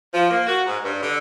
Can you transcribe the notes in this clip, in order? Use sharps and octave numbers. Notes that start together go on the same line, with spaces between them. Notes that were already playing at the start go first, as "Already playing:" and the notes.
F3
A#3
F#4
G#2
G2
D3